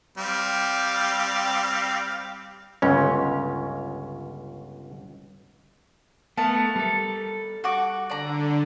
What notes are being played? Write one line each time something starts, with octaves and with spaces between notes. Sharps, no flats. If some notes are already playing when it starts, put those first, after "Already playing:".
G3 C4 F5
G1 C#2 C#4
A3 B3 A#4 A5
G3 A4
F#4 F#5 D6
D3 D5 A#5